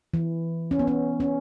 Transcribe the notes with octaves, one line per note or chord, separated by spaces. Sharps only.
E3
C#4
B3
C#4
C#4